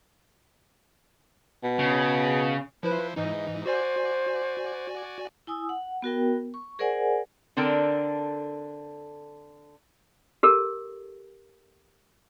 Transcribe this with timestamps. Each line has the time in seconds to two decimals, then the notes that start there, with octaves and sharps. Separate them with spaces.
1.64 B2
1.79 C#3
2.83 F3 E4 B4 C5
3.16 G#2 E3 D#4 D#5
3.66 F#4 C5 D5 G#5
5.47 E4 G#5 D#6 E6
5.69 F#5
6.02 B3 F#4 A#4 G5
6.54 C#6
6.79 G#4 A#4 C5 D5 F#5 G#5
7.57 D3 C4 D4 A4 A#4
10.43 G4 A4 A#4